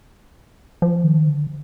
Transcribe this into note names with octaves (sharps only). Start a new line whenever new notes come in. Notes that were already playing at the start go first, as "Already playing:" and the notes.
F3
D#3
D3